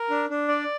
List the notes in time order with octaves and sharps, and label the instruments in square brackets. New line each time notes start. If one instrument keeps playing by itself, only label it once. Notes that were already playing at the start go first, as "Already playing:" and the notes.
Already playing: [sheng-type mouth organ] A#4
D4
D4
D5